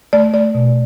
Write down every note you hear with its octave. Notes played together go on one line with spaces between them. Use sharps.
A3 D5
A3 D5
B2